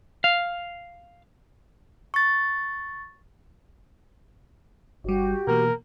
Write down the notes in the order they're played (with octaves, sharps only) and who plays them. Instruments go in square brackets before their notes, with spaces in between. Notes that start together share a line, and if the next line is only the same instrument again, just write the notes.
[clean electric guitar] F5
[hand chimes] C#6 A6
[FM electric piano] G1 G3 [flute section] F#4 G4
[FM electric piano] B2 E3 A#3 [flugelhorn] A#4